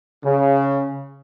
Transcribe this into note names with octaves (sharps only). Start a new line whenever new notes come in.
C#3